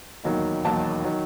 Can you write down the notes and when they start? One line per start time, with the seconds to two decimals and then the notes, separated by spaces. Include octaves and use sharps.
0.24 E1 D#2 D#3 F#3
0.64 E1 D#2 D#3 F#3 A5
1.04 D#3 F#3